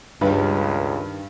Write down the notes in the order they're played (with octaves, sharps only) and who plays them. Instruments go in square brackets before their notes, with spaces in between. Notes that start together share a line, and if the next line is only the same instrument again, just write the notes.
[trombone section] C#2 [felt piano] G2 B4 [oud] D#3 G3 G4